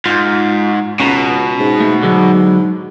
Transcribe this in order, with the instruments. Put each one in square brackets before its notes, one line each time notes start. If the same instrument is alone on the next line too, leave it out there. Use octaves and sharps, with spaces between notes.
[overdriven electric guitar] G#2 [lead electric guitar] F4
[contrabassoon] C#2 [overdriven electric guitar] B2 [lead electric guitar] C#4 A#5
[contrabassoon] G#2
[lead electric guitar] A3
[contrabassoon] G#2 [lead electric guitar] D3 F#3